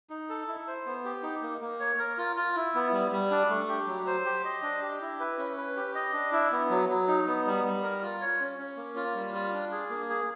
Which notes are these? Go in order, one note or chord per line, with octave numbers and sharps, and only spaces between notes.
D#4
A4
E4
C5
B3
G4
D#4
A#3
A#3
C#5
A#4
F4
F4
E4
B3
G3
G3
D4
A3
G4
F#3
C5
G4
D#5
D4
G4
E4
B4
C#4
B4
G4
D#5
D4
E4
B3
F#3
F#3
D#4
B3
G3
G3
A#4
F4
C#5
C#4
C#4
A#3
F4
G3
F4
D4
G#4
A#3
G#4